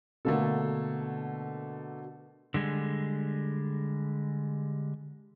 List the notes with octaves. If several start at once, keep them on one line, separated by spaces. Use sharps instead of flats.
B2 D3 A3 A#3 A4
D3 G3 G#3